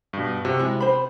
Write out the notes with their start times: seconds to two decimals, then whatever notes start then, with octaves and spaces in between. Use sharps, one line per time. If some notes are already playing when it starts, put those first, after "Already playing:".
0.13 G2 B2
0.45 C3 F#4
0.59 C3 G#3 E4
0.80 C5 B5